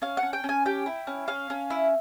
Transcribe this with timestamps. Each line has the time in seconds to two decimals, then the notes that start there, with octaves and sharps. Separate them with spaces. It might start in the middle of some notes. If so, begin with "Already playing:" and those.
0.02 C#4 F5
0.17 F#5
0.23 C#4
0.33 G5
0.44 C#4
0.49 G#5
0.66 G4 G5
0.86 E4
1.07 C#4
1.28 C#4 F5
1.50 C#4
1.70 E4